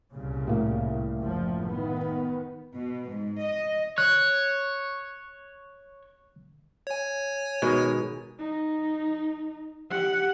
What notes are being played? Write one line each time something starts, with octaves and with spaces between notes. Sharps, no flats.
C2 A#2 C#3
A2 A#3
F#1 F3
D#3 B3
B2
G#2
D#5
C#5 F#6
C#5 G#5
B2 D#3 G#3
D#4
G4 F#5